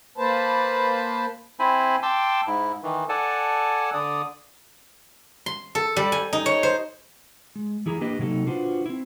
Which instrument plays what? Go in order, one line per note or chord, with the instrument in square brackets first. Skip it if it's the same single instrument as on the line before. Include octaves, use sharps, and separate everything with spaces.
[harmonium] A#3 B4 C5 A5
[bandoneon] C4 E4 C5 G#5 B5
G5 A5 C6 D6 E6
G#2 E4
D#3 E3
A4 D5 F#5 G#5 A5
D3 D5 D#6
[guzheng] C6
A4
G3
G#5
D#4
C#5
C5
[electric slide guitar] G#3
E3 E4 G#4 A#5
A#3 D4 G4 B4 D#5
C3 F#3 A#3 D#4 A4
D4 F4 F#4 B4 C5
C4 E4